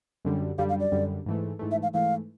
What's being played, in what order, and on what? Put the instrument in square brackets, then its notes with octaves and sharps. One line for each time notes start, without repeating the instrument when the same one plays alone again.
[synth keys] F#2 D3 G3
[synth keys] F#2 D3 G3 [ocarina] F5
[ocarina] F5
D5
[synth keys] F#2 D3 G3
G#2 E3 A3
G#2 E3 A3
[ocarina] E5
F5
[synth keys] G#2 E3 A3 [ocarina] F5